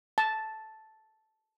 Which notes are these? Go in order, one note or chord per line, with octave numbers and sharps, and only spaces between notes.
A5